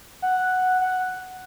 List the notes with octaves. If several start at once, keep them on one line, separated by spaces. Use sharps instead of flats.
F#5
F#5